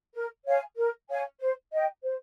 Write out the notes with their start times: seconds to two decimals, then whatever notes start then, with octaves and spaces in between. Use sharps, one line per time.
0.14 A#4
0.46 C#5 F5 G#5
0.77 A#4
1.09 C#5 F5 G#5
1.40 C5
1.72 D#5 G5
2.03 C5